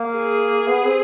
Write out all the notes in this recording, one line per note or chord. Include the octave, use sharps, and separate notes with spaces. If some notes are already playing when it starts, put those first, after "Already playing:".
Already playing: A#3
G#4
B3
C4